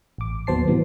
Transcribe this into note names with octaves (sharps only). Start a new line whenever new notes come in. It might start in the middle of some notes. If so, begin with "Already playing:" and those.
A1 D6
D#2 F#3 B3 C5 A5 C7
A2 C3 E3 G3 B3